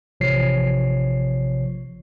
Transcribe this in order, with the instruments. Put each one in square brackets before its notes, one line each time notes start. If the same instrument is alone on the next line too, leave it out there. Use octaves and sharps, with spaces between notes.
[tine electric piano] A1 C3 F3 C#5 C7